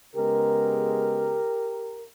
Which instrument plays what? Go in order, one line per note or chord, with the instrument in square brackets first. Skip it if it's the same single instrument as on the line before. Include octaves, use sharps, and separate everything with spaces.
[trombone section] C#3 G#3 B3 G4 A#4